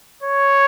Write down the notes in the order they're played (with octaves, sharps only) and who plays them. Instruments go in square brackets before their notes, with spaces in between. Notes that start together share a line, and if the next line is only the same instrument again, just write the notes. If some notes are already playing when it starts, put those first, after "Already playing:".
[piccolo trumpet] C#5